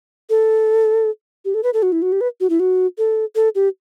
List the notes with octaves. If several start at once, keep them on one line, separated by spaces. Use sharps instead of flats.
A4
G4
A4
B4
A4
F#4
E4
F#4
G4
B4
F#4
E4
F#4
A4
A4
G4